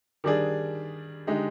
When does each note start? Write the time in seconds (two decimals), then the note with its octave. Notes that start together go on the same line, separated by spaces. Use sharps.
0.24 D#3 G3 D4 G#4 D5
1.27 D3 G#3 D#4 G4